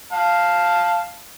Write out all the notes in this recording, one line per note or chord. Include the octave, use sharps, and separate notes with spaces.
F5 A5